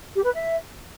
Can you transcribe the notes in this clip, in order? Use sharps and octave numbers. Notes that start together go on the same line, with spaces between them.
G4
B4
E5